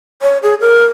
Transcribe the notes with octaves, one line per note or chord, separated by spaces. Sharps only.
C#5
G#4
A#4